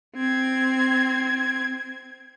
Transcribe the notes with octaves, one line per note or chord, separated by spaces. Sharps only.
C4 G#6